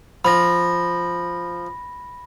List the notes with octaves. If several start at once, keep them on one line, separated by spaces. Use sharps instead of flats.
F3 B5 A#6